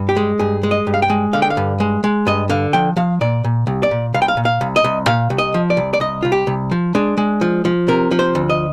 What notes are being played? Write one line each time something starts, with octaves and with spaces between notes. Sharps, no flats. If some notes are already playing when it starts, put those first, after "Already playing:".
Already playing: G2
G4
G#3
G2 G#4
G#3
D#5
G2
F5
G5
G#3
D3 F5
G5
F5
G2
G#3
G#3
G2 D#5
D3 F5
F3 G5
F3 F5
A#2 D5
A#2
C2
D5
A#2
C2 F5
G5
F5
A#2
F5
C2
D#5
C2
A#2 F5
C2
D#5
F3
D5
C2
D5
C2 D#5
C2 F4
G4
C2
F3
G#3 D4
G#3
F3
F3
C3 A#4
F3
C5
D2
D#5